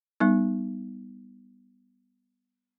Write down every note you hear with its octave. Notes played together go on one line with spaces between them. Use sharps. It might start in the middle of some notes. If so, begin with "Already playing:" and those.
G3 B3 D#4